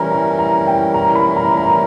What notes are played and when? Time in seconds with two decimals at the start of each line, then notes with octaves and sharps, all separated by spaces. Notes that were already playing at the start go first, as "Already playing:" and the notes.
Already playing: E3 G3 C#4 E4 A#4 A#5
0.11 A#5
0.39 A#5
0.67 G5
0.94 A#5
1.15 B5
1.37 A#5
1.57 A#5